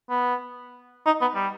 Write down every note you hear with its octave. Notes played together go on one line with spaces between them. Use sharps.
B3
D#4
B3
G3